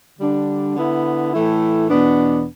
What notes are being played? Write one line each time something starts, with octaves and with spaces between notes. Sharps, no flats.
D3 G3 D4
D3 B3 E4
A2 E3 A3 E4
E2 B2 B3 D4